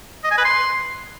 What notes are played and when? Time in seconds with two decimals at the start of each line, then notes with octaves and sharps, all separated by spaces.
0.24 D#5
0.31 G#5
0.38 B4
0.45 C6